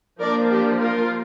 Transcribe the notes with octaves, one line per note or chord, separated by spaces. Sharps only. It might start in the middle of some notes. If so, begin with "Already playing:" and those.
F3 A#3 D4 A#4 D5
D4 G4
F4 A#4